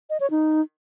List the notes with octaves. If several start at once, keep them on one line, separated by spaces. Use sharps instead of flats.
D#5
C#5
D#4